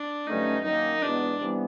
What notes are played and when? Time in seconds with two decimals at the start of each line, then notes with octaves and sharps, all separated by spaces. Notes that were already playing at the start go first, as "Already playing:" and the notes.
Already playing: D4
0.27 G2 D3 F#3 A3 C#4 D#4
0.64 F#2 D#3 F#3 A#3 C#4 D#4
1.02 E2 B2 G#3 B3 D4
1.40 C3 E3 G3 B3